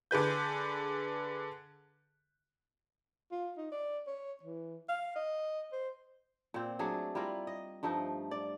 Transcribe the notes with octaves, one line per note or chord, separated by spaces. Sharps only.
D3 G#4 B4 G6
F4
D#4
D5
C#5
E3
F5
D#5
C5
A#2 C4
F#3 A3 D4 G#4
G3 E4 F4 A#4
D#5
G2 F3 A3 D#4
D5